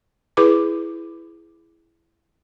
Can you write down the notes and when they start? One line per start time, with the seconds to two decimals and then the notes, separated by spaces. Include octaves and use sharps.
0.37 E4 G#4 B4 D6